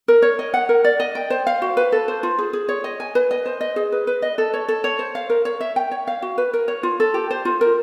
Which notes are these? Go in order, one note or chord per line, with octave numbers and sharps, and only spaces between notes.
A#4
C#5
D#5
F#5
A#4
D5
D#5
G5
C5
F5
F#4
B4
A4
C5
F4
G#4
G#4
C#5
D#5
G#5
B4
D#5
C5
D#5
G#4
B4
B4
D#5
A4
C#5
A4
C#5
C5
F5
A#4
C#5
E5
G5
C#5
F5
F#4
B4
A#4
C#5
F4
A4
G4
C5
F4
A#4